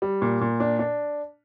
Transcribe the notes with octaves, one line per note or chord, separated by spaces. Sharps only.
G3
A#2
A#2
D4
D4